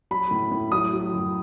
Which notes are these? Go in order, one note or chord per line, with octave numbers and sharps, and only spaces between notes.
F#3 B5
A2
A2
F#3 D#6
F#3
F#2